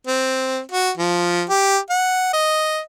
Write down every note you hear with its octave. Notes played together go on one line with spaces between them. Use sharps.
C4
F#4
F3
G4
F#5
D#5